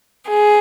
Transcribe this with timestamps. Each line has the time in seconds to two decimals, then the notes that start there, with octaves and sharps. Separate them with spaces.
0.29 G#4